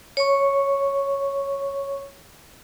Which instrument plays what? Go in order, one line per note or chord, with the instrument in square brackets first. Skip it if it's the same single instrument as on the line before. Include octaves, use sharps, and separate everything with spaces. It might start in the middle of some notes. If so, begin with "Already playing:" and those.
[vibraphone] C#5 C#6